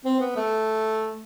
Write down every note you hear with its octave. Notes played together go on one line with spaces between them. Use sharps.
C4
B3
A3